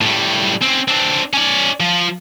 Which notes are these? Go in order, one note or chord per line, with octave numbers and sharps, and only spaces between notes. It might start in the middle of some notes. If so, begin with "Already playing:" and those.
A2 G3
C4 C#4
C4 D4
C#4 D5
F3